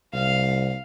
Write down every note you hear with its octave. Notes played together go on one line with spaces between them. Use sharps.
C2 F5